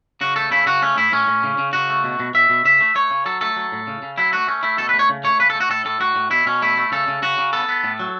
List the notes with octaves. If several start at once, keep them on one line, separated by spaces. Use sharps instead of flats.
C#3 F#4
A3 A4
C#3 E4
C#3 F#4
A3 C#4
A2 E4
A2 C#4
A2
C#3
C#3
C#3 F#4
A3
B2
B2
B2 E5
B2
C#3 E5
A3
A3 C#5
C#3
F#3 A4
A3 A4
F#3
A2
C#3
C#3
F#3 E4
A3 F#4
A3 C#4
A3 E4
B2 A4
B4
A3
C#5
C#3
A3 C#5
C#3 B4
A4
A3
F#4
A2 A4
A2 A4
A2 F#4
A2
B2 E4
B2 C#4
A3 E4
A3
C#3 A4
C#3
C#3 F#4
C#3
B3 A4
B3
A2
F#3